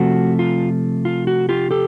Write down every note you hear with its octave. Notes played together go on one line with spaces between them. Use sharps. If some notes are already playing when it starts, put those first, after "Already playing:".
Already playing: C3 F3 A3 F#4
F4
F4
F#4
F4 G4
G4 A4